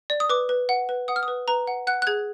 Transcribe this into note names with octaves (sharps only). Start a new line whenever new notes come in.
D5
D#6
B4 D6
B4
F#5
B4
F#5 D#6
F6
D#6
B4
B4 A#5
F#5
F#5 F#6
F#6
G#4 G#6